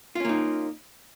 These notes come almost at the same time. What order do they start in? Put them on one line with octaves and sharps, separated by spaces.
F4 C#4 A#3 D#4